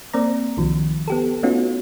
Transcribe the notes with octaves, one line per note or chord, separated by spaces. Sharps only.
A#3 C4 D5 A#5
C2 D#3 F3
B3 G4 A4
A3 B3 C#4 D#4 F4 F#4